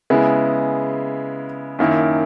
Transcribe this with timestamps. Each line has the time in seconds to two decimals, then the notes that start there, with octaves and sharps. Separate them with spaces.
0.10 C#3 G#3 B3 E4
1.79 F#2 D#3 A#3 E4